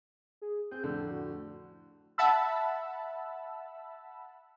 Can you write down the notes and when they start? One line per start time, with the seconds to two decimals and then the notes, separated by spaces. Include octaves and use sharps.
0.42 G#4
0.71 C4 G#4 G6
0.84 F2 A2 D3 A4
1.11 F#4
2.18 E5 F#5 A5 B5 E6